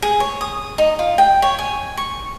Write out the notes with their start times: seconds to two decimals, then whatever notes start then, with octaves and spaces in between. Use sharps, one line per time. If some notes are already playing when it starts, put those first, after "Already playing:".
0.02 G#4
0.20 C#5
0.41 D#6
0.78 D#4
0.99 F4
1.18 G5
1.42 C#5
1.59 G#5
1.97 C#6